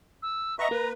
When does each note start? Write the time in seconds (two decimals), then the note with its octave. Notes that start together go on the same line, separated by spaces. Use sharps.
0.22 E6
0.59 B4 D#5 E5 F#5 A#5 C#6
0.71 A#3 B4